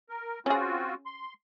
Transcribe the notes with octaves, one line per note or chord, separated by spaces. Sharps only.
A#4
C4 C#4 F4 F#4 G#4
C6